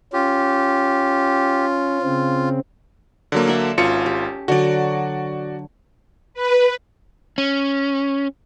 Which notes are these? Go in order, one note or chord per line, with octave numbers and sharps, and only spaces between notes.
C#4 F4 G4
C#3 C4
D3 F#3 A#3
A4 D5 E5
G#1 C#4 F4 F#4 C#7
G4
D3 F#3 F#4 D5
B4
C#4